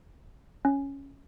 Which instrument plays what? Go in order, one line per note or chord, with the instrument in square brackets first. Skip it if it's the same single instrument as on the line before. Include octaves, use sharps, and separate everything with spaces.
[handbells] C#4